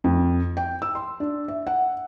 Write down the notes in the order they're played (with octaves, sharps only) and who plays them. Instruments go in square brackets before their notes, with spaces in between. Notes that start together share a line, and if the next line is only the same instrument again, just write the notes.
[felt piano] F2
G5
E6
C6
D4
E5
F#5